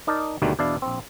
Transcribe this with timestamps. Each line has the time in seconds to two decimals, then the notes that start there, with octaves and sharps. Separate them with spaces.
0.07 D#4 A#4 D5 D#5 A5
0.42 D2 B2 D#3 G3 A3 A#3
0.59 E2 B2 D4 E4 D5 F5
0.82 A#1 C4